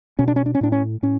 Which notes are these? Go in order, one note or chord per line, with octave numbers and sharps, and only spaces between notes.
B2 C#4
D4
C#4
D4
C#4
A2 D4
C#4
A2 C#4